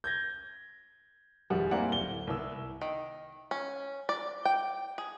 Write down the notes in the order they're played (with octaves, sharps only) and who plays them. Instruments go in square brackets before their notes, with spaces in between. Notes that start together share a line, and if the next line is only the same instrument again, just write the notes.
[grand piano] G6 G#6 A#6
D#1 F2 G3 G#4 F#5
A#3 C4 E4 D5 F#5 G#5
D1 G7
C2 B3 E4 E6
[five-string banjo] D#3
C#4
D5
G5
G#4